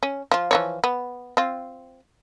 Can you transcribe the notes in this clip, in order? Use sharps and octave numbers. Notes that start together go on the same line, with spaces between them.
C#4
F3 F4
E3 F3 C#5
B3
C4 F4